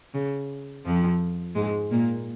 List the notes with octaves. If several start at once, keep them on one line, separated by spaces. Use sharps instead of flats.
C#3
F2 F3
G#2 G#3
A#2 A#3